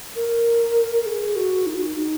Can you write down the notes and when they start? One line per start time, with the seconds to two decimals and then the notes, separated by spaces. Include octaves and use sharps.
0.15 A#4
1.06 G#4
1.36 F#4
1.66 D#4
1.75 F#4
1.82 D#4
1.97 D#4